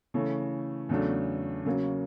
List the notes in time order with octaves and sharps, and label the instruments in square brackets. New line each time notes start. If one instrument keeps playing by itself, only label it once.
[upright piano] C#3 E3 A3 C#4
E2 C#3 F#3 A3 D4
C#3 F#3 A#3 C#4